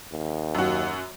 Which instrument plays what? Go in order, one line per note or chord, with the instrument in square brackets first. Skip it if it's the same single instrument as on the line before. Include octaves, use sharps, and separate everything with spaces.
[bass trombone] D#2
[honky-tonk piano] F#2 F#4